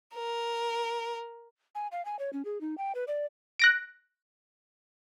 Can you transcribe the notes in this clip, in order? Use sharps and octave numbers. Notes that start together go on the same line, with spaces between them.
A#4
G#5
F5
G#5
C#5
C#4
G#4
D#4
G5
B4
D5
F#6 A#6 D7